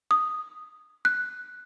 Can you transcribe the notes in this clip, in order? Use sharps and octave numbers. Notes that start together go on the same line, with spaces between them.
D#6
F#6